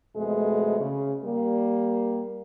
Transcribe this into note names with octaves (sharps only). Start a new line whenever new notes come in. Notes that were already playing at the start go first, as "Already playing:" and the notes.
F2 B2 G#3 A3
C#3
G3 A#3